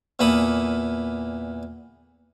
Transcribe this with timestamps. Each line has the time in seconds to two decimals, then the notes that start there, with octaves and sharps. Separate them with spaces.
0.19 E2 A#2 A#3 A4 B5 D#6